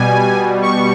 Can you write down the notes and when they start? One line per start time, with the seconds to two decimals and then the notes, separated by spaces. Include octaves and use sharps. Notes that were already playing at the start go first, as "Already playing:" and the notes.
Already playing: B2 G3 G#5
0.62 C#6